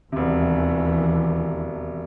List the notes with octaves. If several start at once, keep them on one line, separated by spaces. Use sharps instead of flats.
E1 D#2 C3 E3